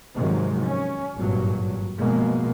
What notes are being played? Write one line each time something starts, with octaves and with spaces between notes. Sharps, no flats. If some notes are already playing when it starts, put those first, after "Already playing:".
G#2 C3 D#3 F3 F#3 G#3
C#4
G#1 G2 A#2 F#3
B2 F3 G#3 A#3